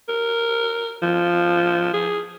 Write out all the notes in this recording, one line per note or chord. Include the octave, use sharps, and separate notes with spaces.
A#4
F3
G#4